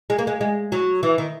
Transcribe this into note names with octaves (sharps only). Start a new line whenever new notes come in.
G#3
A#3
G#3
G#3
F#3
E3
D#3